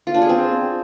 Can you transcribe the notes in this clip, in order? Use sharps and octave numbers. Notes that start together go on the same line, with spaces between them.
F4
D4
G#4
C4